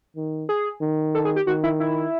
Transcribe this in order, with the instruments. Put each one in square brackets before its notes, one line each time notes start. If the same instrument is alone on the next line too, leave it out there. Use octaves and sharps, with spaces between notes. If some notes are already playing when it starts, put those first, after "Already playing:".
[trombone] D#3
[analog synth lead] G#4
[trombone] D#3
[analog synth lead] A4
G#4
G4
[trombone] D#3 [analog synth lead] F#4
[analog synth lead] E4
E4